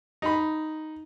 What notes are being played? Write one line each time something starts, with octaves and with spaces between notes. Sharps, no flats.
D#4 B5